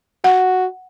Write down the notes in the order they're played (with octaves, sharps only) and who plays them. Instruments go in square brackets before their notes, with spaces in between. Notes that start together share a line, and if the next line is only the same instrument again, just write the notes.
[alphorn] F#4 [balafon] F#5